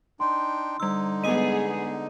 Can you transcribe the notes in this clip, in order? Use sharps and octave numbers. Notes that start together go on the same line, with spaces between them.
D4 D#4 G5 C6
D3 G3 D#4 E6
G#3 B3 G#4 D#5 D#6 D#7